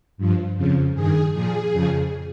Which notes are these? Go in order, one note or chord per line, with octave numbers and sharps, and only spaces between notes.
G2 F3
F2 C#3 F3
G2 D#3 G#4
A#2 F3 G#4
F2 C#3 F3